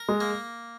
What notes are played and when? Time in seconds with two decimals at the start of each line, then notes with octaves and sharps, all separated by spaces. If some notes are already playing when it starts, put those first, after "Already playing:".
Already playing: A#4
0.09 G#3
0.20 A#3